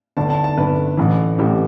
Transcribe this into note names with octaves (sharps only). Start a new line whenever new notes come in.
G1 G2 D3 A5
A5
A5
G1 G2 D3 B4
A1 A2 E3
A1 A2 E3 G4